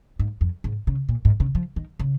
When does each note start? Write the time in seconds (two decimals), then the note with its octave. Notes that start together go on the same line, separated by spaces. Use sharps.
0.19 G#2
0.41 F2
0.64 G#2
0.87 C#3
1.09 A#2
1.25 G#2
1.40 C#3
1.55 F3
1.76 D#3
2.00 C#3